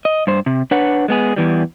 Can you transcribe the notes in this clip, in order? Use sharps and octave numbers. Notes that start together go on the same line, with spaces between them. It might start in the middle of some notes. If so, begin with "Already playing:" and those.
D#5
G2 C5
C3
D4 B4 C#5 F#5
G#3 B3 G#4
E2 E3 G3